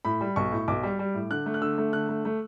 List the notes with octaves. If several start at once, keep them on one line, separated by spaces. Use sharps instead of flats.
A2 B5
G3
B1 C#6
A2
B1 D6
G3
G3
A2
D3 F#6
A3
F#6
D3 E6
A3
D3 F#6
A3
A3